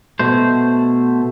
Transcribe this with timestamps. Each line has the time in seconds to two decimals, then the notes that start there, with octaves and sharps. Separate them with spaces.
0.19 B2 A3 C5